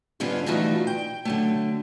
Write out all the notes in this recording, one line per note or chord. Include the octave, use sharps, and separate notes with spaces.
G#2 D3 G3 B3 C#4 F4
E3 F3 G3 A3 D#4 F#4
G5
D3 F#3 A3